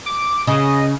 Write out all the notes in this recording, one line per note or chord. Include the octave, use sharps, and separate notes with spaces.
D6
C#3 D#5